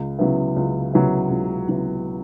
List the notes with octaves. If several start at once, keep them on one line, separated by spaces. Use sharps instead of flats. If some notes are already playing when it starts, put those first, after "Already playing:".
Already playing: C#2
C#3 F#3 B3 E4
C#2
C#3 F#3 B3 E4
C#2
C#3 F#3 B3 E4